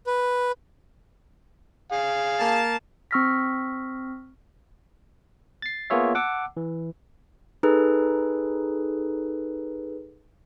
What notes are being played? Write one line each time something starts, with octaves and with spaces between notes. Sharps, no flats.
B4
G#4 F5
A#3 A5
C4 C#6 E6 F6 A#6 B6
A6 C7
A#3 B3 F4 G#4 C#5 E5
F#5 A5 D6 E6
E3
D#4 G#4 A4 B4